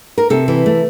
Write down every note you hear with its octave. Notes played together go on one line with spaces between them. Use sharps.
A#4
C3 A4
E3
A3